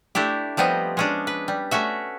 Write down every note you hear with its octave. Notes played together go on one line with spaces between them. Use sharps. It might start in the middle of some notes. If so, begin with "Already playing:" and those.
A3 D4 E4 G4
F3 G3 B3 C4 D#5
G#3 C#4 D4
B4
G3
A3 C#4 F#4 E5